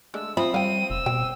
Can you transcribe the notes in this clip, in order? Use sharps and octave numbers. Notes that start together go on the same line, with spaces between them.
D3 G#3 A3 E6
F3 C4 F4 E5 B5 D#6
G3 F5 G5 D#7
F#1 E6
B2 G5